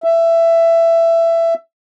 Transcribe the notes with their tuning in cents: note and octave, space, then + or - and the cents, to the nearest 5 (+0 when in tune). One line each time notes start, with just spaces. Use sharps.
E5 +15